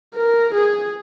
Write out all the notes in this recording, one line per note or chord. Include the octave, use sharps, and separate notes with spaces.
A#4
G#4